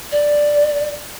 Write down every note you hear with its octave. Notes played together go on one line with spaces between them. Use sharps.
D5